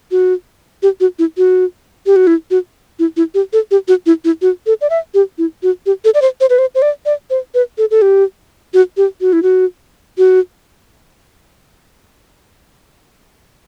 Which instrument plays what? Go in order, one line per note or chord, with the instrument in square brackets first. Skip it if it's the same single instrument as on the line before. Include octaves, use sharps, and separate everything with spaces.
[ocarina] F#4
G4
F#4
E4
F#4
G4
F#4
E4
F#4
E4
E4
G4
A4
G4
F#4
E4
E4
F#4
A4
D5
E5
G4
E4
F#4
G4
A4
D5
C5
C5
B4
C5
C5
D5
D5
C5
B4
A4
A4
G4
F#4
G4
F#4
E4
F#4
F#4